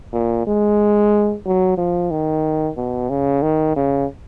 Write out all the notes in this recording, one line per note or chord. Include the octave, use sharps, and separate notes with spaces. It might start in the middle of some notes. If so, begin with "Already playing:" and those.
A#2
G#3
F#3
F3
D#3
B2
C#3
D#3
C#3